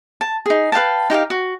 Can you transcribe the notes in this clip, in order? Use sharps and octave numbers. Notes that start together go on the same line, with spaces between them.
A5
D#4 G#4
B4 F5 G5 A5
D#4 G4 A#4 F5
F#4